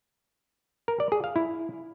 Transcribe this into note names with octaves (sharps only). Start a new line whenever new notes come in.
A#4
D5
G#4
F5
E4